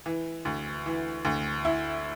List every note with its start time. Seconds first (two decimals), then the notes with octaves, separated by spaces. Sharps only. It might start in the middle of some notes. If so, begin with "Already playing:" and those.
0.06 E3
0.45 D2
0.86 E3
1.25 D2
1.65 E4